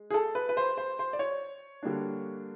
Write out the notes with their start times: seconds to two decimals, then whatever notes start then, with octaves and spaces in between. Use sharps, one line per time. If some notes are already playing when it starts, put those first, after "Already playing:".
Already playing: G#3
0.10 G#4
0.14 A4
0.35 B4
0.49 B4
0.57 C5
0.78 C5
0.99 C5
1.13 D5
1.19 C#5
1.83 D3 G3 A#3 D4